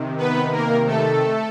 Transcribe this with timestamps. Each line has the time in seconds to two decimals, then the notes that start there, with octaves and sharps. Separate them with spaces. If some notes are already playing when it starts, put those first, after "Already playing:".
Already playing: C3 D#3
0.18 B3 B4
0.52 A#3 A#4
0.87 A3 A4